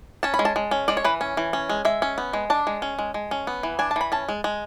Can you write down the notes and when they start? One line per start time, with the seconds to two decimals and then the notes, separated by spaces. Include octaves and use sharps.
0.23 C#4 A5
0.34 B5
0.39 G#3
0.45 A5
0.56 G#3
0.71 C#4
0.88 G#3 D5
0.97 C#5
1.04 E3 B4
1.21 C#4
1.37 E3
1.53 C#4
1.69 G#3
1.85 G#3 E5
2.02 C#4
2.18 B3
2.33 G#3
2.50 D4 A5
2.67 G#3
2.82 C#4
2.99 G#3
3.14 G#3
3.31 C#4
3.47 B3
3.63 E3
3.79 D4 G#5
3.91 A5
3.96 E3 B5
4.12 C#4 A5
4.29 G#3
4.44 G#3